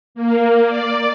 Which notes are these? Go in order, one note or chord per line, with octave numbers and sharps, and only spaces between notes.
A#3
D5